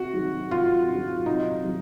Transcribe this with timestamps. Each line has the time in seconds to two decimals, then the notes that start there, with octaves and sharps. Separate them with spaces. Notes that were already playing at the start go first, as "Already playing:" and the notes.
Already playing: C3 F#4
0.13 D#3 F#3
0.51 C3 F4
0.88 D#3
0.93 F#3
1.26 C3 D#4
1.64 D#3 F#3